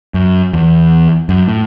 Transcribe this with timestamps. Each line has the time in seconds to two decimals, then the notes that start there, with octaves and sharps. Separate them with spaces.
0.14 F#2
0.53 E2
1.29 F#2
1.48 A2